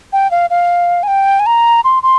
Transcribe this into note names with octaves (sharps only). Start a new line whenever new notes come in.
G5
F5
F5
G#5
G5
G#5
A#5
C6
C6